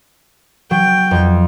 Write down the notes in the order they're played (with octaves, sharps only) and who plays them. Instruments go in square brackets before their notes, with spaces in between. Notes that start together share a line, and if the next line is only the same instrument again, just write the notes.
[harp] F#3 [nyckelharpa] G5
[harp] F2